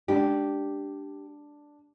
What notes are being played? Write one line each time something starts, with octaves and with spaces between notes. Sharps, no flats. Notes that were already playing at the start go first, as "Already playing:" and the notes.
G#3 C#4 D4 G4 D5